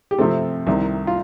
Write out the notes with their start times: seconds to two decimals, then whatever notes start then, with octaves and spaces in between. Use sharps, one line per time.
0.11 G4
0.18 C3 F3 A3 C4 A4
0.67 C2 C3 D#3
1.07 F4